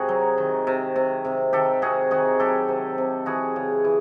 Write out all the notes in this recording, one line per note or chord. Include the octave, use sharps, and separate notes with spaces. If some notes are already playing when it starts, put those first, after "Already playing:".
Already playing: C3 F#4 G#4
F#3
D#3
C3
C3
C3
D#3 G4 A4
C3 F#4 G#4
D#3 F#4 G#4
F#3 G4 A4
C3
C3
E3 F#4 G#4
C#3
E3